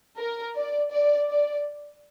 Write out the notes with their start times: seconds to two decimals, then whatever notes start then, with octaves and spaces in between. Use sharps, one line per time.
0.18 A#4
0.56 D5
0.91 D5
1.29 D5